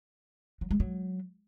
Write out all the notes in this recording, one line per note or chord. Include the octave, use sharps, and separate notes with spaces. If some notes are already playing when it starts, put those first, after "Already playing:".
F#3
G#3
F#3